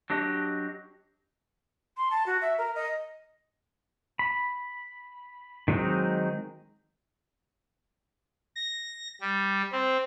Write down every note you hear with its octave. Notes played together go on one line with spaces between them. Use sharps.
F#3 D4 G4 D#5
C6
A5
F#4
E5
A#4
D#5
B5
D#3 F#3 G#3 C4 D#4
A#6
G3
C4